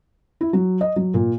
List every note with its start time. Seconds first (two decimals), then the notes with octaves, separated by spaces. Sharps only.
0.41 E4
0.53 F#3
0.81 D#5
0.96 F#3
1.14 A#2